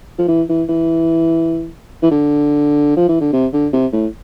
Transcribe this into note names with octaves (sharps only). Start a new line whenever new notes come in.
F3
E3
E3
E3
E3
D3
F3
E3
D3
C3
D3
C3
A2